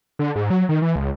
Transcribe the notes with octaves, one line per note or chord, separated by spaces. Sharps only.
D3
G#2
F#3
D#3
E3
C#2